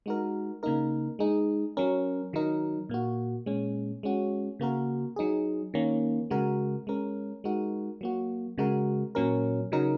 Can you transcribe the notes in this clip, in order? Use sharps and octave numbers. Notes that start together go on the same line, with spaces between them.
G#3 D#4 F#4 A#4
C#3 A#3 D#4 A#4
G#3 D#4 G#4
F#3 C#4 A#4
D#3 F#3 D#4 A#4
A#2 A#3 F#4
A#2 G#3 C#4
G#3 C#4 F#4
C#3 A#3 F#4 A#4
F#3 D#4 G#4
D#3 A#3 C#4
C#3 G#3 F#4 A#4
G#3 C#4 A#4
G#3 D#4 F#4 A#4
F#3 A#3 F#4
C#3 G#3 F#4 A#4
A#2 F#3 C#4 A#4
C#3 F#3 D#4 A#4